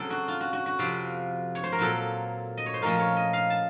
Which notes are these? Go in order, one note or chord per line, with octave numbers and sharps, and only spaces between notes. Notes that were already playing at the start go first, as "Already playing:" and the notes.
Already playing: C#3 F#3 C4 A4
F#4
F4
F#4
F#4
F#4
F2 C3 F3 C4
C#5
C5
A#4
A#2 F#3 C4 F4 A4
D#5
C#5
C5
A#2 F3 A3 C#4 F4 A#4
C#5
D#5
F5
A5